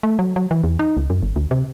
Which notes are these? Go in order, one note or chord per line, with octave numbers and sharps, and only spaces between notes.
A3
F#3
F#3
E3
E2
D#4
C#2
F#2
G1
D2
C3